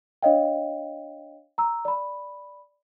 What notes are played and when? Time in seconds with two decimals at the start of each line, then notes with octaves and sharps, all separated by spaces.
0.23 D4 C#5 D#5 F5 G5
1.58 A#5 E6
1.85 D5 B5